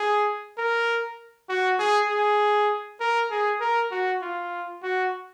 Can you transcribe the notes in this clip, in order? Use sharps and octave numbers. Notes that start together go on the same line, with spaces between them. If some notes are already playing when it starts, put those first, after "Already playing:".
Already playing: G#4
A#4
F#4
G#4
G#4
A#4
G#4
A#4
F#4
F4
F#4